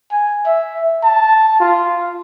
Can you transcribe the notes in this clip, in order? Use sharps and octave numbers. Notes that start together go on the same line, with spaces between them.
G#5
E5
A5
F4